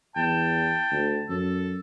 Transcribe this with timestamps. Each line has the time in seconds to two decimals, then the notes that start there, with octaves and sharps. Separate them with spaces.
0.16 E2 G5 A5
0.92 D2
1.29 F#2 A4